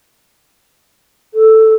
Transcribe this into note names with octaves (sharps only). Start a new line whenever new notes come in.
A4